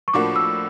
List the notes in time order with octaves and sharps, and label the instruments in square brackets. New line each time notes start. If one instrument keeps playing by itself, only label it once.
[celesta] C#6
[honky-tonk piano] A2 F3 A#3 D4 F#4 [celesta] D6
[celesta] E6